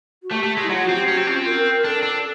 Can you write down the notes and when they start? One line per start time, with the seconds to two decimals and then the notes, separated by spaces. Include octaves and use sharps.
0.23 F#4
0.32 A3 G4
0.44 A3
0.57 G#3
0.63 E4
0.70 F#3 F4
0.82 F#4
0.89 C4
0.95 G4
1.08 C#4 F#4
1.17 C4
1.27 C#4 F4
1.36 C4
1.46 A#4
1.65 A#4
1.84 D4 A4
2.03 D4